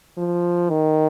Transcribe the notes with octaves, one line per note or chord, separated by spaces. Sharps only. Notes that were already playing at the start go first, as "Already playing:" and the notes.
F3
D#3